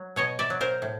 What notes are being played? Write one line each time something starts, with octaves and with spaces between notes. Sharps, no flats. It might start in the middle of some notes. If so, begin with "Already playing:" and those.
Already playing: F#3
B2 C#5 D#5
D5 E5
F#3
A#4 C5
A2